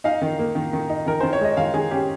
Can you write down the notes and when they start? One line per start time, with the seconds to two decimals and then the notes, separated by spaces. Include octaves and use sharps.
0.04 D#4 F5
0.21 D#3
0.39 A#3
0.55 D#3
0.73 D#3
0.90 D#4
1.06 D#3 A#4
1.20 D#3 C5
1.33 C#5
1.41 G#3 D#5
1.57 D#3 F5
1.74 D#3 G#4
1.91 C#4 G4